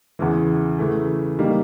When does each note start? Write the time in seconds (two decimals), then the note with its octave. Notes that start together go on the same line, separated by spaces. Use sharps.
0.19 E2 C#3 E3
0.79 C#3 E3 A3
1.39 D#3 G3 A#3